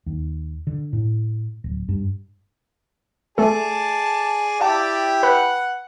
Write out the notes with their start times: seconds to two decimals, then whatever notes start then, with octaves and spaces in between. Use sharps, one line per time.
0.06 D#2
0.67 D3
0.93 A2
1.64 D1
1.89 G2
3.38 A3 G#4 A4 D5 A5
4.60 E4 G4 D5 F5 G5 A5
5.23 B4 F#5 B5 F#6